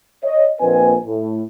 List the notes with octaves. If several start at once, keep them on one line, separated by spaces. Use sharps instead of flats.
C#5 D#5
A#1 A#2 C4 B4 D#5 G#5
A2